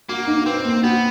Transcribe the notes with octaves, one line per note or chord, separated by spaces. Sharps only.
A#3 F#4
D#4
C4 B4
A#3
B3 F#4